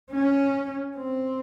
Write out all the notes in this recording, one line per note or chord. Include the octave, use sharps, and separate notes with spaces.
C#4
C4